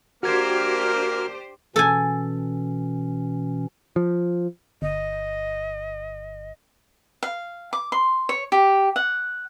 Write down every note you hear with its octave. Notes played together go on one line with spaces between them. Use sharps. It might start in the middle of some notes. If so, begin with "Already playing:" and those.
A#3 D4 F#4 G4 A#4 C5 F6 G#6
B2 E3 C#4 A4 G#5
F3
G1 D#5
F5
D6
C6
C#5
G4
F#5